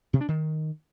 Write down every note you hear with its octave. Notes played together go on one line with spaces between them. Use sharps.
C3
D4
D#3